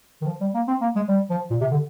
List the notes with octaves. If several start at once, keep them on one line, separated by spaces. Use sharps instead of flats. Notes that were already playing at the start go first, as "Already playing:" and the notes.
D#3
F3
G3
A#3
C4
A#3
G#3
G3
F3
A#2
C3
D3